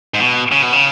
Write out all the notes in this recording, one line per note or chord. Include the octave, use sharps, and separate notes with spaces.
G#2
B2
C#3
B2
C#3